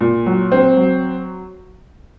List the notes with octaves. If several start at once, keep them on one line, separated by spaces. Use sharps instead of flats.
A#2
F#3
C4
F#3